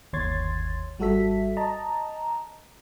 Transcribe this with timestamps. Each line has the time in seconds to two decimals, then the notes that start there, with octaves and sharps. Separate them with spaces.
0.13 G1 D#2 C#5 C6 G#6 A6
0.99 G#1 G3 F#4 A4 E5 B6
1.57 D#5 A5 A#5